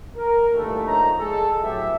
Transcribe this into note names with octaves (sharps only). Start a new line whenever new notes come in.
A#4
G2 A#2 D#3 E3 A3
A#1 F3 D#4 C#5 A#5
G#3 G#4 A4
A2 F#3 A3 B3 G4 E5